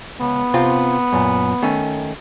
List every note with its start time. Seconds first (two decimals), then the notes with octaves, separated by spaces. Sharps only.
0.21 C#2 B3
0.54 C3 C4 F4
1.13 F#2 A#2
1.62 D#3 A3 C#4